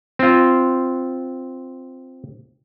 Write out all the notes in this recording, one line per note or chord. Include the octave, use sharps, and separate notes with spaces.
C4 F4